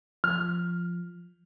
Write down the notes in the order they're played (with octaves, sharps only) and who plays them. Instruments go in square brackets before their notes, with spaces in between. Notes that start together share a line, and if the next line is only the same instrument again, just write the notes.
[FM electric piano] F3 [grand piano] F6